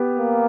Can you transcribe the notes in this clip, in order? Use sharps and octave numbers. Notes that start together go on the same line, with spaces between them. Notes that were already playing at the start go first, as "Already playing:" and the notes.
Already playing: B3 G4
A#3